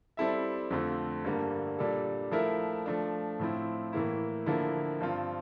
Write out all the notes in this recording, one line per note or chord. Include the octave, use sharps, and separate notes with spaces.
G3 C4 E4 A4 E5
F2 D3 A3 C4 F4
G2 D3 G3 A#3
A#2 G3 D4 A4
F3 A3 E4 A#4 E5
F3 A3 D4
A2 F3 C4 E4
A2 E3 A#3 E4
D3 F3 A#3 E4
G2 F3 C4 F4